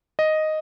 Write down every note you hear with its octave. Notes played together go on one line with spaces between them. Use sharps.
D#5